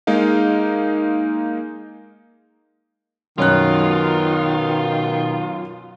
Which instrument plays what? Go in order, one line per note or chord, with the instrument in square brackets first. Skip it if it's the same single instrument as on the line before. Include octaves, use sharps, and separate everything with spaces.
[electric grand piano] G#3 A#3 D#4 F5
[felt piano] F#2 C#5 F#6 [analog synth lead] B2 [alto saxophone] D#3 [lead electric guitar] F4